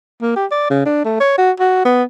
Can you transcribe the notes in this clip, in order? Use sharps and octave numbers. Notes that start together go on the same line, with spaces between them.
A#3
G4
D5
C#3
D4
A3
C#5
F#4
F#4
B3